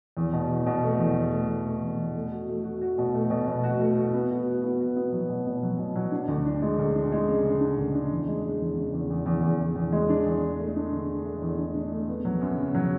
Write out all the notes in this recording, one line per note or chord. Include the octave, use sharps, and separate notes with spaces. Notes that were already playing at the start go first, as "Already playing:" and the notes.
E2
B2
E2
B2
A3
E2
E2
A3
B2
A3
E2
E2
A3
F#4
A3
F#4
F#4
B2
A3
B2
B2
F#4
A3
F#4
B3
F#4
F#4
B3
F#4
B3
F#3
B2
B2
F#3
B2
F#3
D4
D2
D4
G#3
D2
D4
G#3
C#3
C#3
D4
D2
D4
E2
G#3
G#3
E2
C#3
E2
E2
E2
E2
E2
E2
G#3
D4
E2
D4
A3
D4
D3
D3
A3
E2
D4
D4
A3
B3
F#3
F#2
C#3
F#3